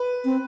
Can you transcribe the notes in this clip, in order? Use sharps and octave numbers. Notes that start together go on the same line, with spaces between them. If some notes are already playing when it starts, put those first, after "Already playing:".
Already playing: B4
C4